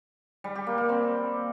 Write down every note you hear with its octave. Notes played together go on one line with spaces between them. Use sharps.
G3
G4
A#3
A#3
C4